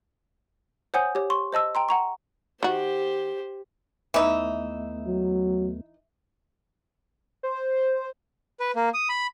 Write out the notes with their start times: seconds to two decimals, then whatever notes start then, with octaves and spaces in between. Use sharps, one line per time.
0.94 C5 C#5 F#5 G#5 D#6 G6
1.15 G4 C#5
1.30 C6 C#6
1.52 C5 D#5 A5 E6
1.75 G5 A#5 C6
1.89 F#5 A#5 C#6
2.63 D#3 F#4 G4 C5
4.14 D#2 E3 A3 B3 D#4 E5
5.07 F#3
7.43 C5
8.60 B4
8.75 A#3
8.94 D#6
9.09 B5